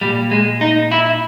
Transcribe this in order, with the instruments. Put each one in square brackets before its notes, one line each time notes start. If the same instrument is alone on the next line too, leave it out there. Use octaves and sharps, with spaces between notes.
[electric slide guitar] A#2 G3
G#3
D#4
E4